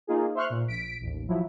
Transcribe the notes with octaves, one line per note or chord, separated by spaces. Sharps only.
A#3 D#4 F4 G#4
C5 E5 C6 C#6 F6 F#6
A#2
A#1 B6 D7
A1 D#2
F3 F#3 E4